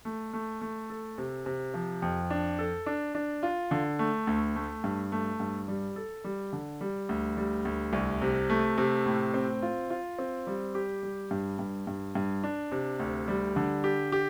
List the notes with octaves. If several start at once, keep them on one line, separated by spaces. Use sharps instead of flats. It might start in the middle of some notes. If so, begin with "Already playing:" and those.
A3
A3
A3
A4
C3
C3
F3
F2
D4
A4
D4
D4
F4
D3
A3
D2
A3
G2
A3
G2
G3
A4
G3
D3
G3
D2
G3
D2
C2
C3
A3
C3
A2
C4
F4
F4
C4
G3
G4
G3
G2
G2
G2
G2
D4
C3
D2
G3
D3
G4
G4